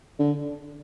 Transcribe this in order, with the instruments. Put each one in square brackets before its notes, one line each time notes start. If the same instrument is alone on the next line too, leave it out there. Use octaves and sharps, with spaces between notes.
[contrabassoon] D3